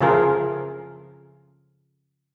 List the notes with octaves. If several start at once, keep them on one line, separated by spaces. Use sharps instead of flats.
C#3 F3 A3 F4 G#4 A#4